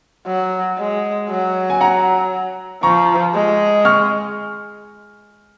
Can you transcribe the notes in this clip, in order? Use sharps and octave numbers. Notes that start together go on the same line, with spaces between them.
F#3
G#3
F#3
G#5
F#5 A#5
F3 A#5 C#6
G#3
C#6 F6